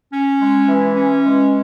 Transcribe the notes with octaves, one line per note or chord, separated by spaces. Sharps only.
C#4
G#3
E3
C#4
G#3